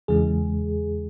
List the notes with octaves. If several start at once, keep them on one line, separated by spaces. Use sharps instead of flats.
E2 C#3 E3 G#3 G#4